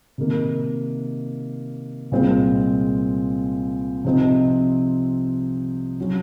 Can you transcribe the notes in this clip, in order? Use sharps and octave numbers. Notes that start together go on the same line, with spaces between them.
C3 D#3 A#3 D#4
C2 A#2 G#3 C4 F4
C3 F3 C4 D#4
F#3 C#4 F#4